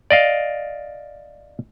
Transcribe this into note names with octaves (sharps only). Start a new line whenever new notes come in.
D5 D#5 F5